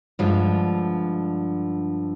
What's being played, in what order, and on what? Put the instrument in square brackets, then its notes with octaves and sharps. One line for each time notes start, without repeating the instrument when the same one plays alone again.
[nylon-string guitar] G2 D3 F3 G#3